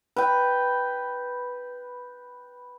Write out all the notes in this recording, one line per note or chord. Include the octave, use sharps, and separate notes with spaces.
B4 G5